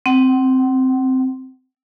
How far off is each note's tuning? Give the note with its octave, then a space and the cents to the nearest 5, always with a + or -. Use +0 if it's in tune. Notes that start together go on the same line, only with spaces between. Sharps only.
C4 +0 F#5 +35